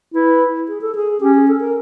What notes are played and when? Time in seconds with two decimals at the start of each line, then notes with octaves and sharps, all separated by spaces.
0.14 E4 B4
0.68 G#4
0.81 A4
0.95 G#4
1.20 C#4 G4
1.35 G#4
1.48 A4
1.60 A#4